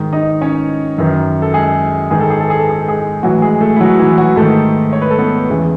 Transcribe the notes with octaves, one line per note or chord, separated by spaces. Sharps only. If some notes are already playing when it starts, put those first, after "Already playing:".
Already playing: G#2 D#3
D#4 D#5
C#4 C#5
F#2 D#3
A4
G#3 G#4
G#2 D#3 G#4
A4
G#4
A4
G#4
A4
G#4
A4
G#3 G#4
A2 E3 F#3 F#4
G#3 G#4
A3 A4
E4
F#3 F#4
E3 E4
F#3 F#4
G#2 D#3 A3 A4
C#5
B4
A4
B3 B4
E2 C#3 E3